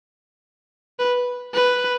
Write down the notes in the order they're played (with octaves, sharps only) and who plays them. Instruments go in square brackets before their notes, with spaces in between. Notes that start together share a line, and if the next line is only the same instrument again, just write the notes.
[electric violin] B4
B4